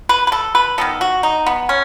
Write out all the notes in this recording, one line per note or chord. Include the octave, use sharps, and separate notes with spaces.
B4
B4
A4
B4
D#3 F#3 B3 A4
F#4
D#4
B3
C#4